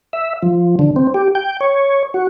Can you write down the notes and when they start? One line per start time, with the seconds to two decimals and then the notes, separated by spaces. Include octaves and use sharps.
0.13 E5
0.43 F3
0.79 D3
0.96 C4
1.14 G4
1.35 G5
1.61 C#5
2.14 F#4